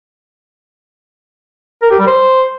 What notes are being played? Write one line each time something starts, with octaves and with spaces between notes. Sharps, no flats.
A#4
G4
G3
C5